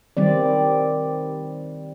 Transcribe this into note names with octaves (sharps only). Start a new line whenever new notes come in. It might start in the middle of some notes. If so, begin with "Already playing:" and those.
D#3 G3 C4 D5